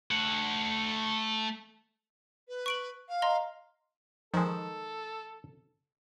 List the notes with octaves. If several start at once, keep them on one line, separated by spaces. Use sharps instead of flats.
A3 F#5
B4
C#6 D7 F#7
F5
D#5 A#5 C6
D#3 F3 G#3 A4